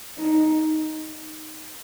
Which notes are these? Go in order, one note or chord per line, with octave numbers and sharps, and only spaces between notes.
D#4